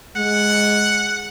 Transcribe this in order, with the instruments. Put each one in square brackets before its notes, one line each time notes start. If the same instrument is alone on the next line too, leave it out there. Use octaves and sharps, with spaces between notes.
[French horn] G#3 [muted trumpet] F#5